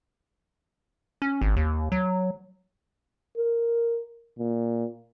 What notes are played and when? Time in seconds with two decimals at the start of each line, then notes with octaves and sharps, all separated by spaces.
1.22 C#4
1.41 G#1
1.56 D#2
1.92 F#3
3.38 A#4
4.39 A#2